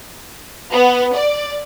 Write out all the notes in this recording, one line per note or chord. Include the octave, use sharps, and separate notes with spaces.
B3
D5